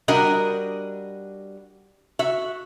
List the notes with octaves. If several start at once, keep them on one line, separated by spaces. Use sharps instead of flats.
G3 D4 F#4 A#4 D#5
F#4 E5